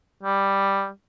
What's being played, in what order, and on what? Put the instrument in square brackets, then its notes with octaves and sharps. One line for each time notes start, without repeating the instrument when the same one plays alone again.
[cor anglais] G3